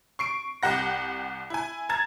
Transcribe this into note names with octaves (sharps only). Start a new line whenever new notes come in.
C#6 C7 D7
C2 G4 F#5 A#6
E4 G#5
A5 A#5 G#6 A6